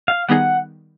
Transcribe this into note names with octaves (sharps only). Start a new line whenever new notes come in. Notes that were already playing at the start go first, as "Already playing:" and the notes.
F5
D#3 G3 B3 D#4 G#4 F#5